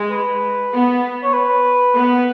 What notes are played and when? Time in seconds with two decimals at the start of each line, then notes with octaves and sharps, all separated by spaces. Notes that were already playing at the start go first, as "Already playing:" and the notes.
Already playing: G#3
0.10 B4
0.72 B3
1.24 C#5
1.33 B4
1.95 B3